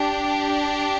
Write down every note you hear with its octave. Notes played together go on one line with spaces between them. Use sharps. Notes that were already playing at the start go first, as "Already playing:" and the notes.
Already playing: D4 G4